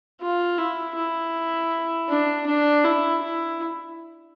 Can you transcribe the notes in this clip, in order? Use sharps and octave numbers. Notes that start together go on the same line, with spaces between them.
F4
E4
E4
D4
D4
E4
E4